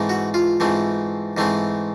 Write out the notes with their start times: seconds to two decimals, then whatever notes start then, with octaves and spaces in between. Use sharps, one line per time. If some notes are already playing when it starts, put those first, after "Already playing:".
Already playing: G#2 E3 A3 C4
0.09 F#4
0.34 F4
0.60 G#2 E3 A3 C4
1.37 G#2 E3 A3 C4